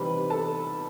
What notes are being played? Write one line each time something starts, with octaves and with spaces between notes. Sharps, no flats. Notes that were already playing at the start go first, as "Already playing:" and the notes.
Already playing: C3 E3 G3 C4 D#4 B4 B5
A4 A5